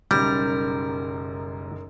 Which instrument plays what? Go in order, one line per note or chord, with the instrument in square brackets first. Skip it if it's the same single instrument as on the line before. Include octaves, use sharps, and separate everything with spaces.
[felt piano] F#1 B1 F#2 [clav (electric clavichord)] G3 [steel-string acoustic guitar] A#4